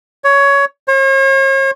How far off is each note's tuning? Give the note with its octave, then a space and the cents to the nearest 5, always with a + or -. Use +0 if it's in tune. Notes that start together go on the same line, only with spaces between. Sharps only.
C#5 +15
C#5 -45